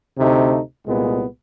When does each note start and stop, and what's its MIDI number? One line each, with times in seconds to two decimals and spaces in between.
0.18 0.60 38
0.18 0.60 48
0.18 0.60 57
0.18 0.60 63
0.86 1.25 36
0.86 1.25 46
0.86 1.25 56
0.86 1.25 59